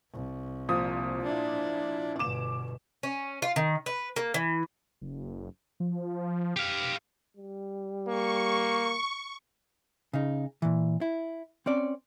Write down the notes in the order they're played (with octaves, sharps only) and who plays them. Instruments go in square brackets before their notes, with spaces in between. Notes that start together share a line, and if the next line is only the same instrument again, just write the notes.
[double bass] C2
[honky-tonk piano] A#2 F3 D#6
[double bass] D4 E4
[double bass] G1 B2 [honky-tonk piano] D6 E7
[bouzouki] C#4
F4
D#3
B4
A#3
E3
[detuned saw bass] F#1
F3
[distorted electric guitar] G4 F5
[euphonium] G3
[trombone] A#3 [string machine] C#6
[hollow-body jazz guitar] C#3 D#4
A#2 E3
E4
C4 C#4 D5